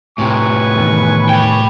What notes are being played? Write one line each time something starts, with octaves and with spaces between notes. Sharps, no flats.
A2 C3 B4 G#5 C#6
E2 D#3
G5 B5